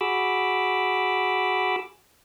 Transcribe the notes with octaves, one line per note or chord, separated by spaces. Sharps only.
F#4 G#4 B5 D6 E6